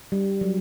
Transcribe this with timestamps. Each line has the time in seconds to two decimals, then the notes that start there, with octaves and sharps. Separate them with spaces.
0.12 G3
0.41 F#3